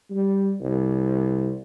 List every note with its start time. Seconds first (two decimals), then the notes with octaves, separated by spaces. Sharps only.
0.10 G3
0.61 C2